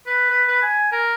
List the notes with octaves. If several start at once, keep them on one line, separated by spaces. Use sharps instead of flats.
B4
B4
B4
G#5
A#4